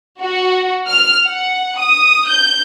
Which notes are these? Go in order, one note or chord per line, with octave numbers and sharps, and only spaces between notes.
F#4
F6
F#5
D#6
G6